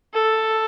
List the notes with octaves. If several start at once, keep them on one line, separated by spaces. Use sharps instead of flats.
A4